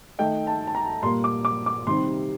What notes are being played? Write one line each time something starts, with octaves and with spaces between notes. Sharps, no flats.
D#3 A3 D#4 G5
A5
A5
A#5
A#2 G3 A#3 C6
D6
D6
D6
C3 D#3 G3 C4 C6